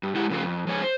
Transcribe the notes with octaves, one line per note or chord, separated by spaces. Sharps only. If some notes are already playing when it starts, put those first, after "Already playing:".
G2
G#3 E4 G4 F#5
C#3 F3 A3 F4
F2
F3 G#3 C#5 G#5
C5